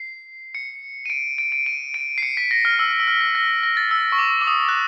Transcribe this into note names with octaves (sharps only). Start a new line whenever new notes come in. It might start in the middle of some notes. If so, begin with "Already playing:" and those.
Already playing: C7
C#7
D#7
D7
D7
D7
D#7
D7
C7
C#7
B6
A#6
F6
E6
E6
F6
B6
A#6
A#6
A6
E6
C#6
D6
D6
D#6
F#6